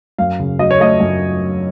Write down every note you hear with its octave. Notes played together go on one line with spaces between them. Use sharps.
F#2 F5
C#3
F#3 D#5
C#5
A3 D#5
F#2